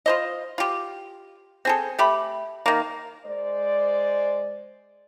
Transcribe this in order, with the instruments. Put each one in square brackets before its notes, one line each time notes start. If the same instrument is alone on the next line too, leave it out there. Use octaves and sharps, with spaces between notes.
[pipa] F4 C5 D#5
F4 G4
C4 G#4 A4
A3 G4 B5
D#3 A#3
[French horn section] G#3 C5 D5